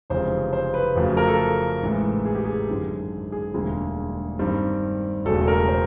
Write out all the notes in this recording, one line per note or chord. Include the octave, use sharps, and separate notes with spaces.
F1 F2 C#3 E3 G#3 C5
C5
B4
F2 C#3 F#3 A3
A#4
A4
A1 G#2 E3 A3
G#4
G4
G#4
G#1 F#2 D3
G#4
E1 D2 D3 G3 A#3 G#4
G2 D#3 G3 C4
E1 E2 C#3 F#3 A3 A4
A#4
C5